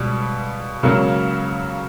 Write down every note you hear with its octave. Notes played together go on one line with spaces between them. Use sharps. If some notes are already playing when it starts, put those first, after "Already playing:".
Already playing: C#2 B2 G3
C#2 C#3 F#3 A#3 C#4